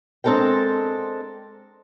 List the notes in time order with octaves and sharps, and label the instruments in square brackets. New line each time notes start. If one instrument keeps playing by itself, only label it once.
[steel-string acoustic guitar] G#3 C4 D4 A4 A#4 G5